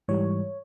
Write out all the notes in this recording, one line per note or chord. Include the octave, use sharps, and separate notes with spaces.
G#2 E3 G3 C#5